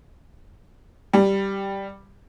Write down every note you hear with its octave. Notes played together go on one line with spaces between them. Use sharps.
G3